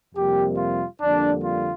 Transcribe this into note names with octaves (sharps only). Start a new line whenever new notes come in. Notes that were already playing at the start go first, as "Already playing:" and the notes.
F2 C3 G3 A#3 G4
F4
F2 D3 G3 A#3 D4
F4